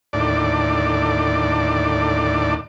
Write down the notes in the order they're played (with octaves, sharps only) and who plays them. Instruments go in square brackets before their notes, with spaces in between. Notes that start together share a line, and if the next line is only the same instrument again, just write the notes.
[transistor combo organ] D#2 A2 D3 D5